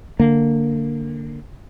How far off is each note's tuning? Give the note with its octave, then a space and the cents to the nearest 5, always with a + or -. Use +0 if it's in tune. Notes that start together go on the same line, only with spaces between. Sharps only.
D3 +0 A#3 -15